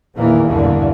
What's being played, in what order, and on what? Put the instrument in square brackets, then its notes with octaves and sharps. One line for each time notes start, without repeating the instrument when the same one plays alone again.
[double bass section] A#1 E2 A#2 D#3 E3 A#3
B1 E2 G2 D3 E3 A#3